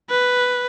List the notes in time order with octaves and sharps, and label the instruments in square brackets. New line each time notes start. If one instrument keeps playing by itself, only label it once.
[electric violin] B4